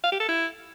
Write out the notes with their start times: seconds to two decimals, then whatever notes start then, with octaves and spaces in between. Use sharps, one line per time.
0.04 F5
0.12 G4
0.20 A4
0.29 E4